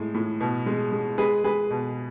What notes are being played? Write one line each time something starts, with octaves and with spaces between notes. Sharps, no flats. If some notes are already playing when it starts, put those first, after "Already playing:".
Already playing: A2 G#3
A2
B2
G#3
G#3
G#3 G#4 B4
G#3 G#4 B4
B2